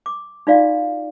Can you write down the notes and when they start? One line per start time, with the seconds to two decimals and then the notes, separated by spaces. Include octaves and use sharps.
0.06 D6
0.47 D#4 F4 F#4 D5 F5